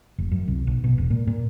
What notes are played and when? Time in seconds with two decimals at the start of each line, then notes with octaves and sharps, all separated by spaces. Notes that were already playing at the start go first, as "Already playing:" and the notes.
0.18 F1
0.31 F#2
0.47 C2
0.67 B1
0.84 B2
0.98 E1
1.10 A#2
1.27 A#2